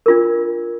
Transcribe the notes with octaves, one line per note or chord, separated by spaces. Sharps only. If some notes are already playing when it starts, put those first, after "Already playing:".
D4 F4 A#4